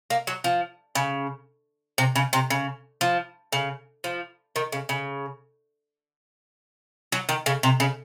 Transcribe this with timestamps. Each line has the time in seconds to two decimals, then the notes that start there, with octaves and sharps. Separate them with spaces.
0.10 A#3
0.27 F#3
0.44 F3
0.95 C#3
1.98 C3
2.16 C#3
2.33 C3
2.50 C#3
3.01 F3
3.52 C#3
4.04 F3
4.56 D#3
4.72 C#3
4.89 C#3
7.12 F#3
7.29 D#3
7.46 C#3
7.63 C3
7.80 C#3